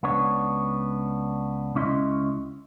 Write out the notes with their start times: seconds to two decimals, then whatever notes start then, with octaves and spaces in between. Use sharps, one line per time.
0.03 C#2 B3 D4 C#5
1.75 C#2 C#4 E4 D#5 C6